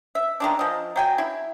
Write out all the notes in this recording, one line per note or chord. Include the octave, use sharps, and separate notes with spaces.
E5
D#3 G#3 D4
F3 D#5
F#3 G5 G#5
E4